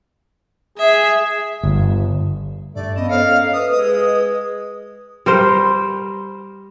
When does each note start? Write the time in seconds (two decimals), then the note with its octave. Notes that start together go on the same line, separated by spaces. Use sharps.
0.78 G#4 E5
1.63 G1
2.75 G2 A3 D5
2.96 A#3 B3 C#4 D#5
3.09 A4 C5 C#5 D#5 F5
3.53 B4 E5 D#6
3.71 G#3 D#6
5.26 G3 A#4 C5